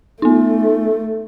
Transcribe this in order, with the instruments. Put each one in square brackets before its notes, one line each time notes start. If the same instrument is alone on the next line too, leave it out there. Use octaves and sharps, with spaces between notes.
[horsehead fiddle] A3 [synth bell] B3 D#4